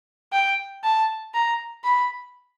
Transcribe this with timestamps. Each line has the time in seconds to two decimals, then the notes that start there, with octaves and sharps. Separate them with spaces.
0.33 G5
0.84 A5
1.34 A#5
1.84 B5